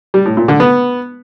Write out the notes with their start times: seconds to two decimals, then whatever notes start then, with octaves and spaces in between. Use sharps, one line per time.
0.14 G3
0.25 A2
0.37 A#2
0.48 D3
0.60 B3